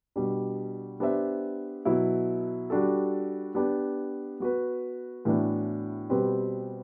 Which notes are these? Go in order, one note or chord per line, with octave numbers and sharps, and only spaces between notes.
B2 G3 D4
B3 D4 G4 C5 E5
B2 F#3 B3 E4
G3 D4 F#4 A4
B3 D4 G4
B3 F#4 B4
A2 E3 B3 D4 F#4
B2 G3 C4 G4 B4